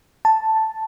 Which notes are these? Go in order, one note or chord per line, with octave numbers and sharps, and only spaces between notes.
A5